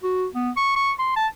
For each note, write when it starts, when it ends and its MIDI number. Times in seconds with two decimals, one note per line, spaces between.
0.04 0.26 66
0.34 0.50 59
0.57 0.74 85
0.76 0.92 85
0.99 1.12 84
1.16 1.27 81